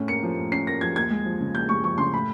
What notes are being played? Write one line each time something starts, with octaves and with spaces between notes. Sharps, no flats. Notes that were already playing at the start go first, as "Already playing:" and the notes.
Already playing: A2 C#4
A#3 C#7
F3
A2
C#4 C7
A#3 A#6
F3 G#6
D#2 G#6
G#3
F3
C#3
D#2 G6
G#3 C#6
F3 C#6
C#3 C6
A2 B5